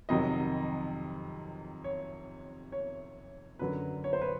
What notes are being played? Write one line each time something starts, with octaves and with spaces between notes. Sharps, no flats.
F2 C3 D#3 F#3 D#5
C#5
C#5
F#2 D3 F#3 B4
C#5
C5
B4